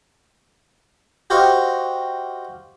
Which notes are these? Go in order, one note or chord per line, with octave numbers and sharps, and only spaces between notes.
F#4 G4 C5 D#5 F5 C#6